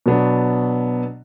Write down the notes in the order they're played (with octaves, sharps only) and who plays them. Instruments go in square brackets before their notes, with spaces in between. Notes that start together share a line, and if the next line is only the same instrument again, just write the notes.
[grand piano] B2 F#3 B3 D4